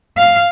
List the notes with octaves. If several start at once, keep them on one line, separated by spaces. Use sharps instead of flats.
F5